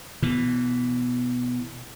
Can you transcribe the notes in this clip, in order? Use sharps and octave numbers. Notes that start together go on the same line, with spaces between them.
B2 E3